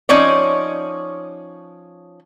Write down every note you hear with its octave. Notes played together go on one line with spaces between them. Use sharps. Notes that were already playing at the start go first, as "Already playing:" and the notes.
F3 C#4 D#4 C#5 D5